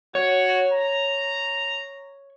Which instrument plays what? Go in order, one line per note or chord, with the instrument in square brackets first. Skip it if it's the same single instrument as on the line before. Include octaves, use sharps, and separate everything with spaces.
[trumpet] F#4 [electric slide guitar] C#5
[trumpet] A#5